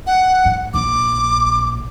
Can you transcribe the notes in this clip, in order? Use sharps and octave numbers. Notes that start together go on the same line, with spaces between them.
F#5
G#2
A#1 A#2 D6